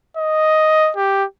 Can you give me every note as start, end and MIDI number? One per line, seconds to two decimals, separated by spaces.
0.17 0.91 75
0.97 1.24 67